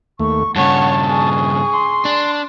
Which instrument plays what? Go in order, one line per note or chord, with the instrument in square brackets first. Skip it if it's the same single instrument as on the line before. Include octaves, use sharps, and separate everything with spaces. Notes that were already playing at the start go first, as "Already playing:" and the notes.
[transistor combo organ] D#2 A3 [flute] C#6
[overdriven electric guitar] G2 C#3 [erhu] C#5 [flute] F#5 [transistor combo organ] A5
[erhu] G#4 [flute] C#6
[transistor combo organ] C6
[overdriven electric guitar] D4